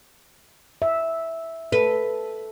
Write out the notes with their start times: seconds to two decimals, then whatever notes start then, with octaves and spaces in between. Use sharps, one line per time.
0.82 E5
1.72 A4 B4